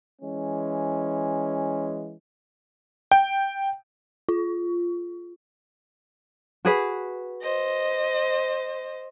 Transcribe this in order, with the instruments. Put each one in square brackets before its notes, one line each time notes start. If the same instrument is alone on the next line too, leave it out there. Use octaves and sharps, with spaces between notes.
[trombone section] E3 G#3 C#4
[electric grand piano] G5
[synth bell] F4
[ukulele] F#4 G#4 B4
[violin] C5 D#5